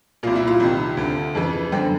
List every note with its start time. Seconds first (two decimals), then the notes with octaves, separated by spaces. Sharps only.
0.23 C2 A#2 F4
0.35 E4
0.47 F4
0.60 C2 C3 D#3
0.97 D2 D3
1.35 F2 C#3 E3
1.72 F#2 D3 C4